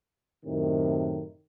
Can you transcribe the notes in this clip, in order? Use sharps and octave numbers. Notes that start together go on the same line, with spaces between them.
F#2 A2 C3 D#3